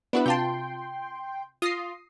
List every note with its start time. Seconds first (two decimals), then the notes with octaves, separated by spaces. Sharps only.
0.13 B3 D4 E4 F#4 B4
0.26 C3 F4 G5 A5 C6
1.62 F4 D#6 A#6 C7